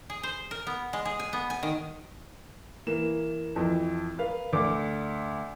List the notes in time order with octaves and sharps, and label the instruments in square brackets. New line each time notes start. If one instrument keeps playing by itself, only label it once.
[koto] G#4
C5
A#4
B3
G#3
G#4
G#5
B3
G#5
D#3
[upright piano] E3 A#3 E7
F2 E3
A#4 B4 F5
D2 D6